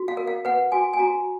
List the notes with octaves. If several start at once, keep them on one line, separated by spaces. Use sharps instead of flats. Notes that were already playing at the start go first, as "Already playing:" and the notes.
Already playing: F#4
F5
A#4
F5
B4 F#5
F#4 G#5
G#5
F#4 A#5